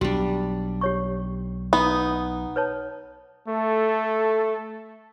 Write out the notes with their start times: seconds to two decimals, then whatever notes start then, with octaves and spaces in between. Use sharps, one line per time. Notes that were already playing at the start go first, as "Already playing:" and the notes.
0.01 B1 G3 D4 F#4
0.81 G4 C#5 C#6
1.73 B3 D#4
2.56 B4 C#5 A5
3.48 A3 A4